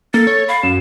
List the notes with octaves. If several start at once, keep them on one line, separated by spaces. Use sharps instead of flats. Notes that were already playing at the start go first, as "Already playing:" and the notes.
A#3 A4 A6
C#5
F5 B5
F#2 E7